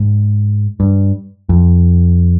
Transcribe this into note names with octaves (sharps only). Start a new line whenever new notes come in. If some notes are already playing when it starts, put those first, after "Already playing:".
Already playing: G#2
G2
F2